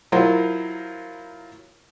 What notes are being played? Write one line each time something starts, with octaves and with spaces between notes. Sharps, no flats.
F#3 E4 F4 A#4 C5